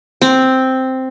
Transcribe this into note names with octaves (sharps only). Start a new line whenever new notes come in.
C4